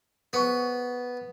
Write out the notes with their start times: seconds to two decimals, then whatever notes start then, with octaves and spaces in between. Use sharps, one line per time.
0.33 B3 G#4 C5 C#6